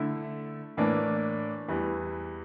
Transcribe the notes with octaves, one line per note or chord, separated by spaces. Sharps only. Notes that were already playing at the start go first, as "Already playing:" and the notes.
Already playing: D3 A3 E4
A2 E3 A#3 D4
E2 E3 G3